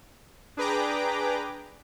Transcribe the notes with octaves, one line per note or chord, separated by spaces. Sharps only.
D4 G#4 B4 G5 A#5 D6